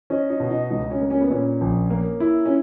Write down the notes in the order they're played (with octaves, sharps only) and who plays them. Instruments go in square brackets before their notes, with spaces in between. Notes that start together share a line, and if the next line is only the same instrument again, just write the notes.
[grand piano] C#4 [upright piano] D#4
[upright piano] D#4
[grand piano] B2
[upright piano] D#4
[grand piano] C#2 [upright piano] D#4
[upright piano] C#4
[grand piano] A#3
[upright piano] C#4
B3
[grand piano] A#2 [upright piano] C#4
[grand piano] A#1
A#3
E4
[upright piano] C#4